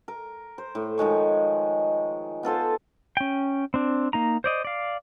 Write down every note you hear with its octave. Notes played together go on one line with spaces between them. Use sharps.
A#4
C5
A2
D#3 F3 G#3 C#5
B3 F4 A4 C5
C#4 G5
C4 D4
A#3 D#4 A#5
C5 D5 D#5
D5 F5